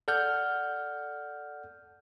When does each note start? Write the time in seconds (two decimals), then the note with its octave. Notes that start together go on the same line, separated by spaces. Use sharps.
0.08 A4 D5 F#5 F6 G6